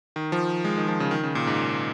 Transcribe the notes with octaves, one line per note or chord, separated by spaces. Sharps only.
D#3
F3
G#3
D#3
F3
C#3
D#3
C#3
A#2
G#2